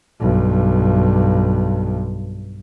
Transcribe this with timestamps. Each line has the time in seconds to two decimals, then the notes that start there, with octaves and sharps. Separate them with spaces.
0.20 B1 G2